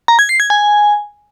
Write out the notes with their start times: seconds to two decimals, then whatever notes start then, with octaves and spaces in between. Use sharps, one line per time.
0.08 A#5
0.19 G#6
0.29 C7
0.40 G#6
0.50 G#5